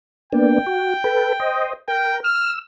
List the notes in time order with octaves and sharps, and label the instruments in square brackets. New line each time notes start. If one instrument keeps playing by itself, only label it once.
[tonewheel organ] A#3 B3 D4 [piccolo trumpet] G5
[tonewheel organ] F#4
A4 B4
C5 D#5
[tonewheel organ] A#4 [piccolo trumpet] G5
[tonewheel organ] E6 [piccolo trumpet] F6